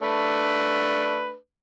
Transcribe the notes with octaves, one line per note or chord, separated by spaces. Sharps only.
A3 D4 B4